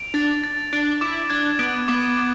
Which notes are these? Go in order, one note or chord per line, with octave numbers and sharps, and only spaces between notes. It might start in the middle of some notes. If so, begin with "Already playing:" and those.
Already playing: D7 F7
D4 A6
A6
D4 D7
E4 D6
D4 G#6
B3 D7
B3 D6
D6